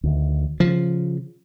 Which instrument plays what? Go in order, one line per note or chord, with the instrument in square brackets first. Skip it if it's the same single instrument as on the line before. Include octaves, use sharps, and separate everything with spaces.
[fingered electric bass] D2 D#3
[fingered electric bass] C#3 [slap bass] F3